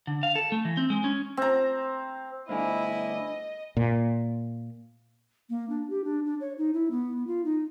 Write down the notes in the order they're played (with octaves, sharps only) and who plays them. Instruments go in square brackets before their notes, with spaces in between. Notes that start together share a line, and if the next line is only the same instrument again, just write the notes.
[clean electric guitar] D3
F5
A4
A3
E3
C4
G#3
C#4
[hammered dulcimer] C4 A#5
[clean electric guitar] D2 G2 D3 [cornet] E4 [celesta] C5 F5 G#5 [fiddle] D#5
[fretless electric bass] A#2
[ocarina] A#3
D4
G4
D4
D4
C#5
D#4
E4
B3
F4
D#4